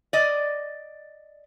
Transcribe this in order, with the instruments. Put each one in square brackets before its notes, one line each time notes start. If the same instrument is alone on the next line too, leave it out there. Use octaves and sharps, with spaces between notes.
[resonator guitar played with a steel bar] D5 D#5